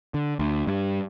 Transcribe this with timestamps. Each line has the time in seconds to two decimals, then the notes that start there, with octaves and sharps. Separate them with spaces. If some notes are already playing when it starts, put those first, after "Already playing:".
0.14 D3
0.39 D2
0.67 G2